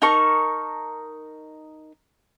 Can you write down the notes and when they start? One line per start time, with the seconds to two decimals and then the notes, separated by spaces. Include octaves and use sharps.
0.02 D#4 A#4 A5 C#6